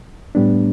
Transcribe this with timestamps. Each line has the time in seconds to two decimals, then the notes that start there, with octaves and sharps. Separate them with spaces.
0.35 A2 G3 B3 D4